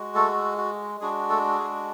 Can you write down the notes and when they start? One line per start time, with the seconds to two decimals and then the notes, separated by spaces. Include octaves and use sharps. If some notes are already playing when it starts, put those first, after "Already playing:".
Already playing: G#3 F#4
0.15 A3 A4
0.58 F#4
1.00 G#3 D4 F#4 G#4
1.30 A3 A4
1.58 G#4